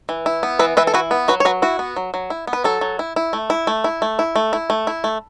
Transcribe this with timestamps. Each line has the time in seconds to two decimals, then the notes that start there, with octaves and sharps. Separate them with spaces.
0.09 E3
0.26 E4
0.43 B3
0.59 E3 B4 E5
0.77 E3 B4 E5
0.87 A4
0.94 E4 F#4 B4
1.11 B3
1.28 F#3 F#4 B4
1.40 C#5
1.45 F#3 F#4 B4
1.62 E4 F#4
1.79 B3
1.96 F#3
2.14 F#3
2.30 E4
2.47 B3
2.53 B4
2.64 F#3 A4
2.81 F#3
2.99 E4
3.16 E4
3.33 A3
3.50 E4
3.67 A3
3.84 E4
4.02 A3
4.19 E4
4.36 A3
4.53 E4
4.70 A3
4.87 E4
5.04 A3